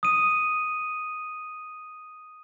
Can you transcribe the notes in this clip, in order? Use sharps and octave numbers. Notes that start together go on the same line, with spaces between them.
D#6 D#7